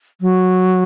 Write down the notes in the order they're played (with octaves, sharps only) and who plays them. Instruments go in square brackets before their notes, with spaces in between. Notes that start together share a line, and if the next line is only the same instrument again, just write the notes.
[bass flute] F#3